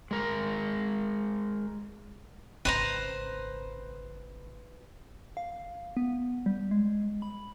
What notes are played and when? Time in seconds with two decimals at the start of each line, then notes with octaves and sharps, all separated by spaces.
0.11 G#3 A#4
2.65 G#1 C#3 B4 C5 A#5
5.37 F5
5.97 B3
6.46 G3
6.71 G#3
7.22 B5